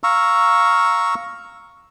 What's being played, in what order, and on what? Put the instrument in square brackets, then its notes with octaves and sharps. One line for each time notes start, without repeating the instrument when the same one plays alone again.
[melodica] F5 A#5 C#6 E6